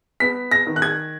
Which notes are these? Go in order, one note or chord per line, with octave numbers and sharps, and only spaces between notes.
B3 B6
A#6
D#3
F#6
G#6